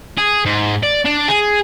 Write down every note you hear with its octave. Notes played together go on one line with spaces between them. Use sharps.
G#4
G#2
D5
D4
G#4